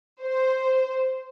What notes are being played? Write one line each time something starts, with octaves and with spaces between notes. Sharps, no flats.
C5